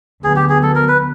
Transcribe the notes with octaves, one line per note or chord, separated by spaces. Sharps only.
D2 D3 F#3 B3 G#4
G4
G#4
A4
A#4
B4